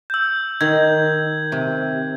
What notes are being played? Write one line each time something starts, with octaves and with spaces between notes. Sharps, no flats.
E6 G6
D#3 G#6
C3